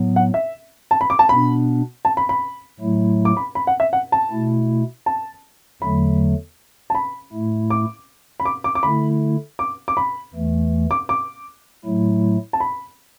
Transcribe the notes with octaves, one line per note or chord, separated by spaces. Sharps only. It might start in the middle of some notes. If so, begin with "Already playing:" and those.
Already playing: A2 F#3 B3
F#5
E5
A5
B5
D6
A5
B2 B3 D4 B5
A5
B5
B5
A2 F#3 A3 E4
D6
B5
B5
F#5
E5
F#5
A5
B2 A3 E4
A5
E2 D3 F#3 A3 B5
A5
B5
A2 A3 E4
D6
B5
D6
D6
D6
D3 A3 E4 B5
D6
D6
B5
E2 E3 A3
D6
D6
A2 F#3 A3 E4
A5
B5